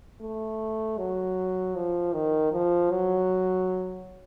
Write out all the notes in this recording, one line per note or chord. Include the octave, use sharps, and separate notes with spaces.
A3
F#3
F3
D#3
F3
F#3